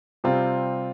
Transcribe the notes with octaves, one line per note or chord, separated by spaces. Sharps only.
C3 G3 C4 F4